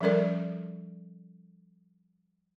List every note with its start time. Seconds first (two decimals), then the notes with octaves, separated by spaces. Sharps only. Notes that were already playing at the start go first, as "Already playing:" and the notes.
0.01 F3 G3 C#4 A4 A#4 D5